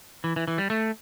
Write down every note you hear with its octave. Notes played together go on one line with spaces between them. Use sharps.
E3
E3
E3
G3
A3